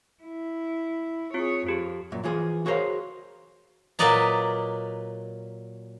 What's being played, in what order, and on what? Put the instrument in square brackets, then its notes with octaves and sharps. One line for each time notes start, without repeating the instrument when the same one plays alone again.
[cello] E4
[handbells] C4 F4 [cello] G#4 C#5
[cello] F2 F3 [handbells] F4 G4 G#4
[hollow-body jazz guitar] F#2 A#2
E3 F3 G#4
F#4 G#4 A#4 C5 C#5 F5
[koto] A#2 F#3 B4 D5 D#5 A#5